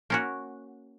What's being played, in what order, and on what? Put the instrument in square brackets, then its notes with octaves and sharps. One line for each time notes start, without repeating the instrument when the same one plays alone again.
[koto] A#3 C#4 F#4